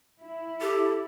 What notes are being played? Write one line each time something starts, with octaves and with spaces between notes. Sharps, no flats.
E4
G4 A4